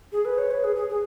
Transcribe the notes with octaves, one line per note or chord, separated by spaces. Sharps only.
G#4
B4
C#5
B4
G#4
G#4
G#4